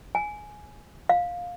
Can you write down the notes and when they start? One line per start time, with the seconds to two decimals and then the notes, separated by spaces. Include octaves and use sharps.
0.15 G#5
1.09 F5